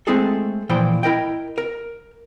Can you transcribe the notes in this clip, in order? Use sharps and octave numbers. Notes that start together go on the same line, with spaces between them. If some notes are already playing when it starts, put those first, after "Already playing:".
G#3 A3 C4 E4 G#4 A4
A#2 E3 F3 C5 G5 B5
E4 A#4 D#5 G5
A#4